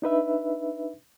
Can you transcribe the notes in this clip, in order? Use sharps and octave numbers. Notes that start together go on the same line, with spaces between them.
D4 D#4 B4 E5